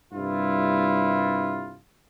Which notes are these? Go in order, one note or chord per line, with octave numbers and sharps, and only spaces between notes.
C2 G2 E4 F4